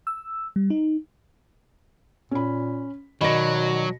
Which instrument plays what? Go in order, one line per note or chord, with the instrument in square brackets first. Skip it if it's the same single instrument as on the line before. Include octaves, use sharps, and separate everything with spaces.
[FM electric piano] E6
G3
D#4
[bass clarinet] A#2 [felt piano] C#4 B5
[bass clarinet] B2 [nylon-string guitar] D#3 D5 [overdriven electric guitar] F#3 [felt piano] B5 A#6